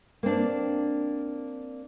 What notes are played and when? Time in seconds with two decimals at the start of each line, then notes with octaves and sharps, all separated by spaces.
0.23 A#3 C4 D4